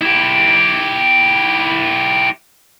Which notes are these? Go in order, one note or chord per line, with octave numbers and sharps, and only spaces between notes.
E4 G4